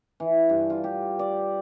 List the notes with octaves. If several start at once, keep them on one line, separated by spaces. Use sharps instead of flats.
E3
G2
F4
G4
D5